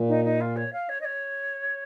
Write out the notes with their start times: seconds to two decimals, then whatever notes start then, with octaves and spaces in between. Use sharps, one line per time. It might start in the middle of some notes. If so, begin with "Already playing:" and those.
Already playing: A#2
0.09 D#4
0.25 D#4
0.41 F4
0.57 C#5
0.73 F5
0.89 C#5
1.01 D#5
1.05 C#5